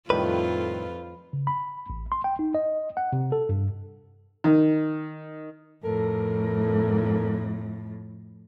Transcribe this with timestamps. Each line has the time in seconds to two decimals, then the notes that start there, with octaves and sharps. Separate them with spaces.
0.10 F2 A2 D#3 G3 F4 B4
1.33 C#3
1.47 B5
1.90 A1
2.12 C6
2.24 G5
2.39 D#4
2.55 D#5
2.97 F#5
3.13 C3
3.32 A4
3.49 G2
4.44 D#3
5.84 F2 A2 A4 A#4